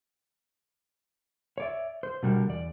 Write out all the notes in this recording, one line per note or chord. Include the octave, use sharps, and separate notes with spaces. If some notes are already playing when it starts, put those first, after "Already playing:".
C#5 D5 E5
C5
B2 D3 G3 F#4 A#4
E2 D5